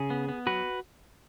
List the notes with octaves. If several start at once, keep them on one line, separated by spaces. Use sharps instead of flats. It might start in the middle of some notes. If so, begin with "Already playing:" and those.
Already playing: C#3 G#4
B3
B3
F#3 F#4 B4